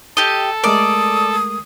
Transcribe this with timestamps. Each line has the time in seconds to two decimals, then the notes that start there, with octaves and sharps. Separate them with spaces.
0.17 G4 A4 D#5
0.64 G#3 A3 A#4 D5 D#6